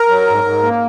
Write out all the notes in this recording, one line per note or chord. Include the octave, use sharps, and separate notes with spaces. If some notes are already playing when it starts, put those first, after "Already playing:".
Already playing: A#4
F#3
G#2
G#2
A#3